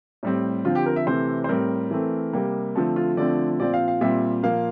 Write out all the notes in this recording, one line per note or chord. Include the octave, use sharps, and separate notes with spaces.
A2 G3 C4
D3 F3 C4 F4
G4
A#4
E5
C3 E3 A3 C4 C5
C5
A2 G3 C4 A#4
E3 A3 C4
C3 G3 A#3
D3 F3 A3 C4 A4
F4
D3 F3 A3 C4 D5
A#2 F3 C4 D5
F5
F5
A#2 G3 C4 E5
A#2 F3 A#3 F5